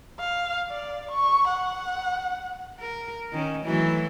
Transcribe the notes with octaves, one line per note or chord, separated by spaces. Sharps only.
F5
D5
C#6
F#5
A#4
D#3 C#4
E3 F#3 A3